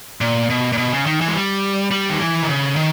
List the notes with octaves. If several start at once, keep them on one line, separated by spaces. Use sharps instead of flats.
A#2
B2
A#2
B2
C#3
D#3
E3
G#3
G3
G3
D#3
E3
D#3
C#3
D#3